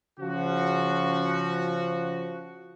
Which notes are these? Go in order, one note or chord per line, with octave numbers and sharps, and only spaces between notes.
C#3 F3 F#4